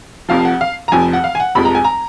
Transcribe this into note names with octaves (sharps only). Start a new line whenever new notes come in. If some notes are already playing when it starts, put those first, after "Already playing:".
F1 F2 F3 F5
F#5
F5
A#5
F1 F2 F3 G#5
F#5
F5
G#5
F#5
F1 F2 F3 G#3 B5
A#5
G#5
A#5